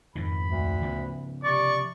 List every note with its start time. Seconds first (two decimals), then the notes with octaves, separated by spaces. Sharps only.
0.15 F2 G#2 D#3 B5
0.50 D2
0.82 C#3 F3 B3
1.44 C3 D5 C#6